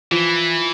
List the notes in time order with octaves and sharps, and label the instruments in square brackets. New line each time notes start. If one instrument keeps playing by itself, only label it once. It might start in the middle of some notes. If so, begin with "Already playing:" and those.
[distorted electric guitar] E3 [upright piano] F3